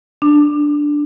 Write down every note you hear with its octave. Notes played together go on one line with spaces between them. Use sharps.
D4